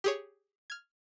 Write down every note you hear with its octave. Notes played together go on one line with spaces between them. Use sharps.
G4 G#4 C#5
F6 G#6